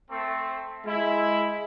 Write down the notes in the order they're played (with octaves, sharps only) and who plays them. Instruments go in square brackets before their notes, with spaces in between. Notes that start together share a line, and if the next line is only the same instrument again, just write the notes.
[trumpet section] A3 C4
[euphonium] G#3 [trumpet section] E4